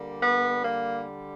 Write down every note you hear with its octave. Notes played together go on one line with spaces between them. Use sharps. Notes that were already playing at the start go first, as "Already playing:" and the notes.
Already playing: D3 G3 A#3
B3
A#3